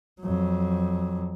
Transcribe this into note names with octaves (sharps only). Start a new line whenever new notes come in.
F2 F#3